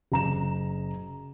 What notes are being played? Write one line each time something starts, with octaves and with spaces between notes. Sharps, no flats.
F#1 A#5 E7